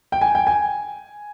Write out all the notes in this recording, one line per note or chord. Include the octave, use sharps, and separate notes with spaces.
G5
G#5
G5
G#5